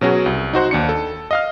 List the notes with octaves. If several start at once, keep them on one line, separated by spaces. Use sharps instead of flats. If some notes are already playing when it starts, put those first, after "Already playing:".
B2 F#3 C#4 F#4 G#4
C2
D#4 F#4 C5 F#5
D#2 D4 C#7
A4
D#5 F5 F6